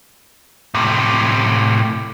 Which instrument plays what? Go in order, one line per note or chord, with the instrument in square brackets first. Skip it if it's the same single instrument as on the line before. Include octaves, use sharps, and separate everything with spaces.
[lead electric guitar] A2 C3